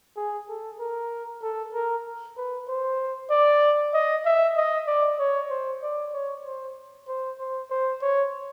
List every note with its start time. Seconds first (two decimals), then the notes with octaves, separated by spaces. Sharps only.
0.17 G#4
0.49 A4
0.80 A#4
1.43 A4
1.74 A#4
2.37 B4
2.69 C5
3.31 D5
3.94 D#5
4.25 E5
4.57 D#5
4.87 D5
5.19 C#5
5.50 C5
5.83 D5
6.14 C#5
6.45 C5
7.08 C5
7.39 C5
7.70 C5
8.02 C#5